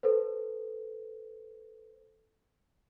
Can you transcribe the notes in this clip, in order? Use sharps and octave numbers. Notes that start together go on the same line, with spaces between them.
A4 B4 C5